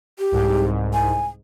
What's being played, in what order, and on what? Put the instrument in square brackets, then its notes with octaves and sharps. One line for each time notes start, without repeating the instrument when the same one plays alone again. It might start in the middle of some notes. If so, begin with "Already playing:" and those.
[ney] G4
[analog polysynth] C2 G#2
[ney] G#5